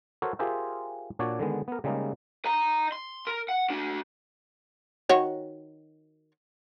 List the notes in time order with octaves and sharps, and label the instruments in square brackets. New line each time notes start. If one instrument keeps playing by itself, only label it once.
[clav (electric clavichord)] F#4 A4 A#4 C5 C#5 F#5
F4 G4 G#4 A#4 C5 E5
A#2 D4 F#4 C#5 D5
D3 D#3 G#3 B3
B3 A#4
C#3 G3 G#3 A#3 D#4
[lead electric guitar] D#5 A#5
C6
A#4
F#5
D4 F#4
[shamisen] D#3 F#4 C#5